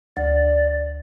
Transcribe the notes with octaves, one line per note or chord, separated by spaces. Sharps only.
D2 D5